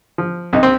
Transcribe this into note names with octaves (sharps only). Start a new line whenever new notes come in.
F3
C2 D#4
C4